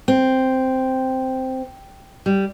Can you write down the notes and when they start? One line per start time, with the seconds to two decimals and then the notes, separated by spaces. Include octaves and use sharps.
0.08 C4
2.26 G3